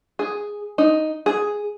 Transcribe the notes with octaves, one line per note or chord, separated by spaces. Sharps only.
G#4
D#4
G#4